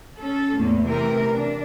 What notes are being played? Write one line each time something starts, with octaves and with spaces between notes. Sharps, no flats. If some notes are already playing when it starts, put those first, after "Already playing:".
C#4 A4
E2 A2 A#3
C3 E3 A3 A#4
D4